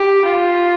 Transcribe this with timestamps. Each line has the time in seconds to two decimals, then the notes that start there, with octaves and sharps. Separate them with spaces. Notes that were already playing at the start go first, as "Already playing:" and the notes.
Already playing: G4
0.25 F4